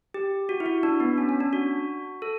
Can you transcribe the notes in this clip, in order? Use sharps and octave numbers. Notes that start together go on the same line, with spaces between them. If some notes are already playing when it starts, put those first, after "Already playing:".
G4
F#4
E4
F#4
D4
B3
C#4
C#4
D4
F#4
A4